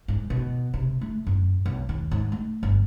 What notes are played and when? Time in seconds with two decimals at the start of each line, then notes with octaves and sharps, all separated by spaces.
0.08 G#2
0.30 B2
0.74 C3
1.01 A3
1.27 F#2
1.66 B1
1.89 D#2
2.11 G#2
2.32 A3
2.63 G1